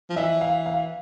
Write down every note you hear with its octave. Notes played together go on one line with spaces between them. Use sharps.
F3
E3 E5
F5
F5